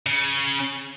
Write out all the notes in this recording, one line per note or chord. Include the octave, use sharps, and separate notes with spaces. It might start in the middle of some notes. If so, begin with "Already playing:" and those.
C#3